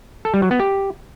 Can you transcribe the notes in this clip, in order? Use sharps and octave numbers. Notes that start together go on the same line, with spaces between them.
A4
G3
F#3
B3
G4